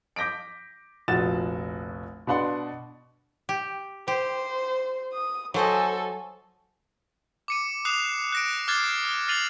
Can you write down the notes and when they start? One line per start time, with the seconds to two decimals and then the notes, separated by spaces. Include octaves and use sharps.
0.16 D6 G6 A#6 B6 D7
1.08 F1 A#1 F3 F#4 A6 E7
2.27 B2 B3 D4 F#5 C6
3.49 G4
4.08 G4 C5
5.13 D#6
5.54 F#3 A4 C5 D#5 G#5
7.48 D6 C#7 D#7
7.85 D6 D#6 F#6 C7 E7 F7
8.32 F#6 A#6 D7
8.68 D6 F6 F#6 G#6 A6 C7
9.05 F6
9.28 F6 A6 C7 D#7 F7 F#7